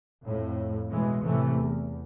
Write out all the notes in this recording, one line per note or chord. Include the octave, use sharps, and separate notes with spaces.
F2 A2
B1 B2 E3 G#3
A2 C3 E3 A3
E2